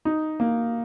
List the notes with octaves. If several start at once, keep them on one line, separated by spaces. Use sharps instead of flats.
D#4
A#3